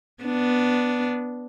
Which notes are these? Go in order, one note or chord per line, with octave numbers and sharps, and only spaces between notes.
B3 D4